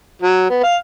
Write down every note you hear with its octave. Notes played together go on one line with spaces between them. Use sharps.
F#3
B3
F5